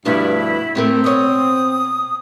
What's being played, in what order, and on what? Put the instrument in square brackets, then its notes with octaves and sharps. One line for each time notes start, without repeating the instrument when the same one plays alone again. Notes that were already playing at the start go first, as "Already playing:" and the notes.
[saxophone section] G2 D4 [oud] B2 F3 A3 [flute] E4
[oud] A2 A3 A#4 [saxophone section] C4
[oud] B2 C#5 [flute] D#6